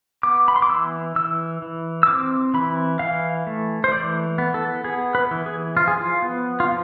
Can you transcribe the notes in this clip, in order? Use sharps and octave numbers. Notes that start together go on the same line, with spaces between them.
B3 D6
B5
C6
D6
E3 E6
E3 E6
E3
E6
C4 D6
E3 B5
E3 F5
A3
C5
E3 D5
B3
A4
B3 G#4
B4
E3
G#4
F3 F4
G#4
F4
B3
F4
F3